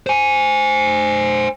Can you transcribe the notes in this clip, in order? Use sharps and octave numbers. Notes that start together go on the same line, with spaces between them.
C5 G#5